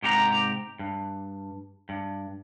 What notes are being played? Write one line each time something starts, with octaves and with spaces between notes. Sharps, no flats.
G#2 C3 G4 A4 A#5
G2
G2